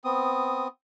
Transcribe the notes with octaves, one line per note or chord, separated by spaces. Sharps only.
B3 C4 D#6